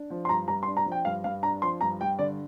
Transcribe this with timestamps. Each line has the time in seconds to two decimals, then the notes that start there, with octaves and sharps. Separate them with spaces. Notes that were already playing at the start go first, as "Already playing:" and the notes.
Already playing: D4
0.10 F3
0.25 C6
0.29 G2 A#5
0.48 G2 A#5
0.63 C6
0.67 D4
0.77 A#5
0.86 F3
0.92 G5
1.05 G2 F5
1.24 G2 F5
1.43 D4 A#5
1.62 F3 C6
1.81 G2 A#5
2.01 G2 G5
2.19 D3 D5